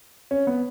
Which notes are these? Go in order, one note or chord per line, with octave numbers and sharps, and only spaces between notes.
C#4
B3